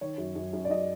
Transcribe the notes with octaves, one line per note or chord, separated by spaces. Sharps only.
D#3 C#5
F#2
F#2
F#2
D5
F#2 D#5